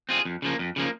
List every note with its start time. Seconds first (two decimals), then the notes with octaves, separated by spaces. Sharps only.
0.09 C4 F4 G#4
0.25 F2
0.42 C#3 F3 A#3
0.59 F2
0.76 C#3 F3 A#3